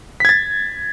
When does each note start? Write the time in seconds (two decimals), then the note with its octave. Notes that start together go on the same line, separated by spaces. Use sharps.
0.20 B6
0.25 G#6
0.29 A6